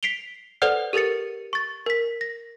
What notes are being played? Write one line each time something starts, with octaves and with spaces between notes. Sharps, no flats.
B6 C7 D7 F7 G7
A4 B4 C5 D5 F#5 F6
G4 A4 A#4 A6 C#7
C#6 A6
A#4 B6
A#6